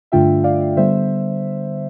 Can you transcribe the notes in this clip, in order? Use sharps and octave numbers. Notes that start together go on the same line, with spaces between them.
G2 D3 A3 D4 F4 E5 G5
D5 F5
D3 G3 B3 C5 E5